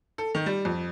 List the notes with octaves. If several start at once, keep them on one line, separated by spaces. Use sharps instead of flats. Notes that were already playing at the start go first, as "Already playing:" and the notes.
A4
D#3
G3
F2